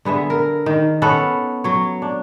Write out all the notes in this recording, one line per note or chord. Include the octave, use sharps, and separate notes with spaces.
D3 B3 G#4 E5
A#4
D#3
B3 C#4 A4 F#5
F#3 C#5
D4